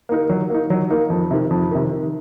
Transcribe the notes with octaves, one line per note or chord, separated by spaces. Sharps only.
A#3 D#4 A#4
F#3
A#3 D#4
F#3
A#3 D#4
F2
C3 D#3
F2
C3 D#3
D#3